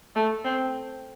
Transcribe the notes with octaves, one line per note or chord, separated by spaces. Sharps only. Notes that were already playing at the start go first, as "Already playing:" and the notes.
A3
C4